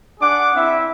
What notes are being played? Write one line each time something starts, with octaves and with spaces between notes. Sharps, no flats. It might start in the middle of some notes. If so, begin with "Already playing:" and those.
D4 G#4 F#5 D6
C4 E4 E5